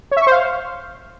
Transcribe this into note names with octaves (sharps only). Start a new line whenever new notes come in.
C#5
E5
C#6
C5
F5